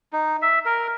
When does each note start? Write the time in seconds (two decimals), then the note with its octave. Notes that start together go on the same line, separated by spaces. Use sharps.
0.13 D#4
0.42 E5
0.66 A#4